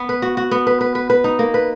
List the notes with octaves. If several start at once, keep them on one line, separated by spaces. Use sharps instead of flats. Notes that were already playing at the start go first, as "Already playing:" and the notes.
Already playing: B3
B4
F#4
F#4
B3
B4
B4
B4
B4
D#4
A#3
B4